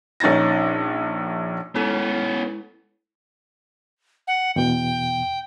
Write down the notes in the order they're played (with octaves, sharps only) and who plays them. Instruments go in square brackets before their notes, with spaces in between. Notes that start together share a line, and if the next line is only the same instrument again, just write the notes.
[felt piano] A#1 C#4 D#4 A6 A#6
[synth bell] G#3 E4 A4 [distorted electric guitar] B3 C#4
[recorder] F#5
[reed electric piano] E2 B2 [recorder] G5